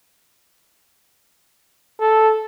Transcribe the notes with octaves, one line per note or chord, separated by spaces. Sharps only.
A4